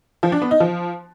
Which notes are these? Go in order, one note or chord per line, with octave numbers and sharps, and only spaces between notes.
F3
D4
B3
D#4
F3